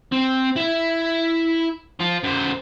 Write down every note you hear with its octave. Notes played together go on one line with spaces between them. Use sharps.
C4
E4 E5
F3 F4
F#2 C5